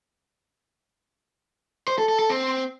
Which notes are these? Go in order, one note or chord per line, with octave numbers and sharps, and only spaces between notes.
C5
A4
A4
A4
C4